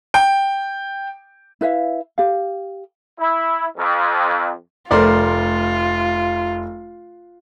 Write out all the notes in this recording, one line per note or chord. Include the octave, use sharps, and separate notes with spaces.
G5
E4 B4 E5 F5
G4 F5
E4
F2
F1 A3 F4 A#4 C5 D5